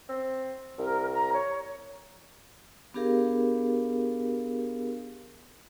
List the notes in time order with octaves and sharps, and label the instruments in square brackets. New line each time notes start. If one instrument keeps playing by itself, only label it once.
[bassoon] C4
[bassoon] C2 [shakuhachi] A#4
[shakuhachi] A#5
C#5
[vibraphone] B3 D4 G4 G#4 A#4 F5